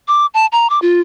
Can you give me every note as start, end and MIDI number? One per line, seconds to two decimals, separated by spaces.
0.08 0.26 86
0.34 0.46 81
0.52 0.70 82
0.70 0.79 86
0.82 1.01 65